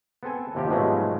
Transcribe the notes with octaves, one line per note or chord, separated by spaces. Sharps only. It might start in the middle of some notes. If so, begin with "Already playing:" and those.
B3 C4 A4 G#5
D#2 C3 F3 G4
G#2 B2 F3 F#3 G#3 A3